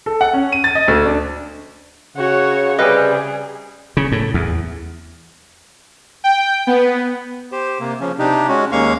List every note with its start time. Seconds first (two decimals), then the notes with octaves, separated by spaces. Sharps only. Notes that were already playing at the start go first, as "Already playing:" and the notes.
0.06 A4
0.21 F#5
0.33 C#4
0.52 D#7
0.64 A6
0.75 D#5
0.88 D2
1.05 D4
2.17 C#3 F#4 C#5
2.78 C3 G3 G#4 B4 D#5
3.97 C#3
4.12 A2
4.34 E2
6.24 G5
6.67 B3
7.52 G4 C5
7.80 C3 A#3
8.00 C#3 F3 C#4
8.19 C3 D4 D#4 G4
8.48 G#3 C#4 F#4
8.72 D#2 G#3 A#3 C#4 F5 C#6